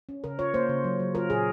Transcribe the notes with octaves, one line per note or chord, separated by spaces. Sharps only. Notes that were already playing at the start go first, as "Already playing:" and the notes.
C#4
C#3 A#4
F4 C#5
A#3 C5
C#3
F#3
F#3
F4 A#4
A#2 G#4